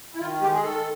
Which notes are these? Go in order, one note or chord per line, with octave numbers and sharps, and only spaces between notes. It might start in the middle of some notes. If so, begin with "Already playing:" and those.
E4
D#3 F4
G#3 G4
G#4
D#3 A4